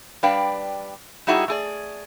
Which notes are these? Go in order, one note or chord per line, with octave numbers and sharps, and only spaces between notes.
G3 D4 B4 D5 F5 G5
G3 D#4 E4 F#4 G#4 E5
A3 G#4 D5